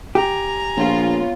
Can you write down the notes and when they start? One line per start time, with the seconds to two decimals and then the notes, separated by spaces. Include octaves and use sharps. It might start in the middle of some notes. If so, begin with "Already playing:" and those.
0.15 G4 G#5 A#5
0.77 A#1 B3 F4 C#5